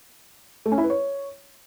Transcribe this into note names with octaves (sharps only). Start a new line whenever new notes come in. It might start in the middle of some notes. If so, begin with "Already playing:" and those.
A3
C#4
E4
B4
C#5